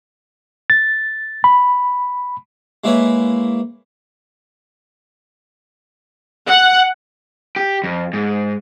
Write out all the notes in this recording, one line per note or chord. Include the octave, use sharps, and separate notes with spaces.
A6
B5
G#3 A#3 E4 B4 C#5
F#5
G4
F2
G#2